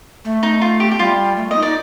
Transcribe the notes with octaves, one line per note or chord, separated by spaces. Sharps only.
A3
D#4
F4
G4
G4
G3 F4
A3
A#3
D#4 D#5
D#4 D5